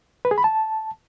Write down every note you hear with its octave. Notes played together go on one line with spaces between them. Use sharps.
B4
G#4
B5
A5